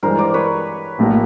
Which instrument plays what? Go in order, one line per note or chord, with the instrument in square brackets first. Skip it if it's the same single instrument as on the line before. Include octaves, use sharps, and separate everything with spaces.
[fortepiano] G2 E3 G#3 [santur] A#4 C5
[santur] C5 D5
B4 C#5
[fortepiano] A#1 A2 F#3 A#3 D#4